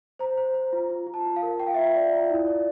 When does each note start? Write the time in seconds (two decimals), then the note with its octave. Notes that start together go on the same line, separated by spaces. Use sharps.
0.19 C5 A#5
0.37 C5
0.54 C5
0.73 F4
0.89 F4
1.07 F4
1.14 A5
1.25 F4
1.36 F5
1.43 A#4
1.60 F4 G5
1.67 F5
1.74 E5
1.78 F4 F5
1.95 D5
2.13 F4
2.30 E4
2.47 D5